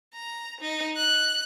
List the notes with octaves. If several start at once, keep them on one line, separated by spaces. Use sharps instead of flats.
A#5
D#4
F#6